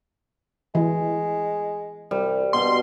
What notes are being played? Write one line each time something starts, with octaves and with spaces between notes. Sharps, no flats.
E3 G#3
C2 G3
G2 B2 C6